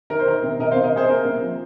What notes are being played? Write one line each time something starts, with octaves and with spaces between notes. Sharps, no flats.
D#3 A#4
C5
D#3 A#4
C3
C3 A#4 D#5
C5 F5
C3
A#4 D#5
C3 G#4 C5
C5
A#3 A#4
C3
F3